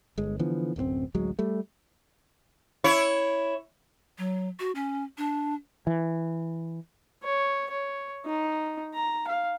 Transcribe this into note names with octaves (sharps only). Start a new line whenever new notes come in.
G1 G#3
D3 E3 F3 B3
D1 F#2 A3 C4
A1 D2 F#3 G#3
G3 A3
E4 C#5
F#3
F#4
C#4
D4
E3
C#5
C#5
D#4
A#5
F5